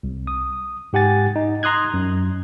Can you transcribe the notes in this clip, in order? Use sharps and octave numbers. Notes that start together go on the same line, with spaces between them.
C2
D#6
G#2 G4 F#5 G#5 A6
D#4
A#5 C6 D#6 F#6 G#6
F#2